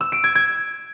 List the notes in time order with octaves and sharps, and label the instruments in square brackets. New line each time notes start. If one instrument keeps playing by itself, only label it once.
[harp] E6
D7
G#6
G#6